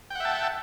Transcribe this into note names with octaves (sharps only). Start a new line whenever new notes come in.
E5 F#5 G5 A5